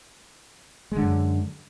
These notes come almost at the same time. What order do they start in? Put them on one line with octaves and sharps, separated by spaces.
G#3 D3 F#2